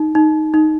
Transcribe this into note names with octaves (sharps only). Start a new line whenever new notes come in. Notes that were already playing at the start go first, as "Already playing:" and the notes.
Already playing: D#4
D#4
D#4